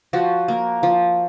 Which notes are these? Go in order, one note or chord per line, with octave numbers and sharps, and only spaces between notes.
F3 F#4
A#3
F3